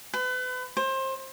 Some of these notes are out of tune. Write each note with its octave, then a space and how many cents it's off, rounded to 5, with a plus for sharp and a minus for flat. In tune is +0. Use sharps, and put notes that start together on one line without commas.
B4 +35
C5 +25